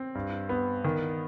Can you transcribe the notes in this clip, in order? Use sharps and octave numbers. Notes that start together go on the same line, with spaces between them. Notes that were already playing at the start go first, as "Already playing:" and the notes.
Already playing: C4
G2
B3
D#3